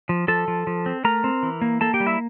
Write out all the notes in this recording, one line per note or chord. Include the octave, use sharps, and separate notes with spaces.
F3
F3 A4 A5
F3
F3
C4
A3 A#4 A#5
C4
E3
A#3
A#3 A4 A5
G4 G5
G3
E4 E5